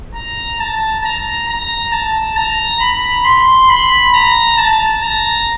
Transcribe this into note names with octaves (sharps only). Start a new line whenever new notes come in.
A#5
A5
A#5
A#5
A5
A#5
B5
C6
B5
A#5
A5
A#5